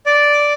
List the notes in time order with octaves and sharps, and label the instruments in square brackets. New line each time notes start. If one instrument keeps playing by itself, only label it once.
[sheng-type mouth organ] D5